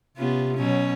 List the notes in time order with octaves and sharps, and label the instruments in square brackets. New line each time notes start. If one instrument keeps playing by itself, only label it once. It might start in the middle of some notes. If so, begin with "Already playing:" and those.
[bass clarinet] C3 [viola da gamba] B3 C#4 F4
[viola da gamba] B2 F#3 C#4